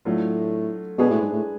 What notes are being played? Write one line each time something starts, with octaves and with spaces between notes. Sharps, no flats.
A2 F#3 A3 D4 F4
B2 G#3 D4 G#4 B4
A2
G#2
A2